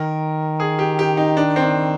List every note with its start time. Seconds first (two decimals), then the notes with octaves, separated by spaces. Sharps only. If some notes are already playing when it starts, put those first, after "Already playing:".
Already playing: D#3 A#4
0.60 G#4
0.79 G4
0.99 G4
1.17 D#4
1.37 D4
1.56 C4
1.62 D4